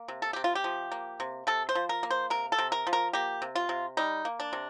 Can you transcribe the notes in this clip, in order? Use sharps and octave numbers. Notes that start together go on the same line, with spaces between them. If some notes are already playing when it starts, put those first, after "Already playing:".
Already playing: A#3
C3
A4
C3 G4
F4
G4
F3
A#3
C3
C3 A4
C5
F3
A#4
A#3
C5
C3 A#4
A4
C3
A#4
F3
A#4
A#3 G4
C3
F4
C3
G3 D#4
A#3
D4
C3